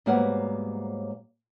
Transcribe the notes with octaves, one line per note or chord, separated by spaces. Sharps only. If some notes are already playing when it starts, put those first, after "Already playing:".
G#2 F#3 G3 A#3 B3 F#5